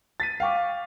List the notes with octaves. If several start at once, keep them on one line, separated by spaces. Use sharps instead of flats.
A6 B6 D#7
F5 G5 C#6 D6